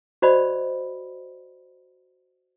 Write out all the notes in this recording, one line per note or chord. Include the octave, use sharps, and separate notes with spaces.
F#4 C5 D5 D#5 B5